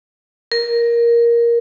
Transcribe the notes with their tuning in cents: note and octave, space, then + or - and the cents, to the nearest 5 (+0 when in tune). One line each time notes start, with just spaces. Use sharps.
A#4 +10